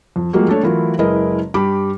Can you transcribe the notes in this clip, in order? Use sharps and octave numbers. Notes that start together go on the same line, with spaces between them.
F2
F3 G3 G#3 A#3 F#4
A3 D4 A4 C#5
E3 F#3 A3 E4 F4 A#4
F#1 G#3 E4 A#4 B4 D#5
G2 G4 B5 D6